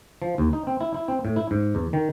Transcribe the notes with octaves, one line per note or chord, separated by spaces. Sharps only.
F3
D#2
D#4
C4
E4
E4
C4
A2
E4
G#2
E2
D#3